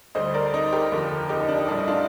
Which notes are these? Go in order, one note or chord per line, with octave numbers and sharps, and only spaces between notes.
D2 D3 G3 C5 D#5
A#4 D5
D#4
G4 A#4
F1 D#2 D3 F3
D#4 G4
D#4
D4
D#4
A#1 A2 G3 D4
D#4
D4 F4